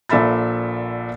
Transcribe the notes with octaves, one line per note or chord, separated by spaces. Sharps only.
A#1 A#2 A4 E5 B5 A6